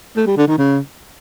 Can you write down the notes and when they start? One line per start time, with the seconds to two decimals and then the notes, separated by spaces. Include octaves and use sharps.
0.16 A3
0.27 G3
0.37 D3
0.48 D#3
0.58 C#3